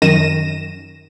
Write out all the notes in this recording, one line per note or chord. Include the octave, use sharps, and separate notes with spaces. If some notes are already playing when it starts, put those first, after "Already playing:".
F#2 D#3 A#6 D#7 E7